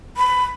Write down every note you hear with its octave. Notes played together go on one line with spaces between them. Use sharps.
B5